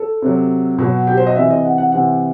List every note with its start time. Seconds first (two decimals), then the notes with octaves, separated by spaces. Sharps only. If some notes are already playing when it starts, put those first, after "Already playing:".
Already playing: A4
0.22 C3 F#3
0.78 B2 F#3 F#4
1.07 G4
1.17 C5
1.27 D#5
1.36 C3 E3 E5
1.51 D#5
1.65 F#5
1.78 F#5
1.92 C3 E3 F#5